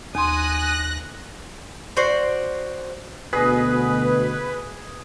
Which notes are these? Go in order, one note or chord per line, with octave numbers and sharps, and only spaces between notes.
D#2 G#5 C6 D#6 F#6 A#6
F#4 C5 D5
D2 B2 G#4 B4 D#5